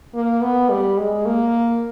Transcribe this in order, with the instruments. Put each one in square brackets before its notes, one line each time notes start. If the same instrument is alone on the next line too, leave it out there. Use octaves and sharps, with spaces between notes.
[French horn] A#3
B3
G3
G#3
A#3